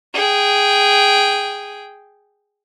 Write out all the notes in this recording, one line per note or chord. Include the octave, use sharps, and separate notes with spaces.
G#4 G5